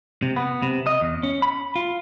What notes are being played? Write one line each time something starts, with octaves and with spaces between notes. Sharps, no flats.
C3
B3
C3
D#5
E2
C#4
B5
F4